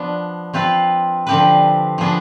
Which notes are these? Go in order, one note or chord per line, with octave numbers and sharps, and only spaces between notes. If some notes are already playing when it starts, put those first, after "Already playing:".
Already playing: F3 B3 D4
F3 C4 F4 B4
D3 F3 C4 G4 B4
F3 B3 D4 G#4